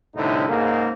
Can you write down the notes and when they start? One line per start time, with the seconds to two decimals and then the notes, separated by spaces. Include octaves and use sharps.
0.15 C2 A2 D3 D#4 E4
0.48 C#2 G#2 C#3 A#3